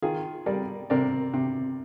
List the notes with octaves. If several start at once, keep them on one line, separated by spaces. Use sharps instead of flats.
D#3 F4 G#4
G3 A#4 D5
C3 A#4 D5
C3